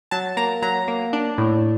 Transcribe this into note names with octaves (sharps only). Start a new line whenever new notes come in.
F#3 A5
A#3 A#5
F#3 A#5
A#3
D4
A2